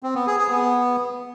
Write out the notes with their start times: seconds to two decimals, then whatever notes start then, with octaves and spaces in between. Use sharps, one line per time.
0.03 C4
0.15 B3
0.27 G#4
0.39 G#4
0.51 B3